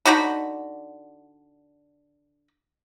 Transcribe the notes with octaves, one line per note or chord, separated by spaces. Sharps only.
D3 D#4 F#4 B5